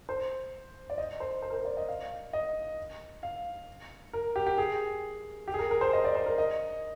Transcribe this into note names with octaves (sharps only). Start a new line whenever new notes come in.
C5
D5
D#5
C5
C5
A#4
C5
D5
D#5
F5
D#5
F5
A#4
G4
G4
G#4
G4
G#4
A#4
A#4
C5
D#5
D5
C5
A#4
D#5